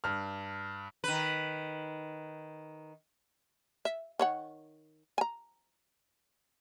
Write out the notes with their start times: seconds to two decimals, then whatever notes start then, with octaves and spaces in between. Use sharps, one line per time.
0.04 G2 F6
1.04 D#3 B4
3.85 E5
4.19 D#3 C#5 F#5
5.18 G#5 A#5